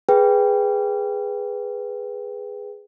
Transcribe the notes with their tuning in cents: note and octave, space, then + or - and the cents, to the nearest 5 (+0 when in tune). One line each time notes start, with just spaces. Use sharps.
G#4 -5 B4 +0 G5 +0